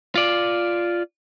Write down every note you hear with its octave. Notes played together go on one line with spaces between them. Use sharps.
F4 D5